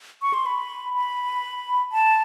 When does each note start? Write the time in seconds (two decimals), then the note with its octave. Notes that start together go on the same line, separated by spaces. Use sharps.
0.22 C#6
0.34 C6
0.46 B5
0.94 B5
1.92 A5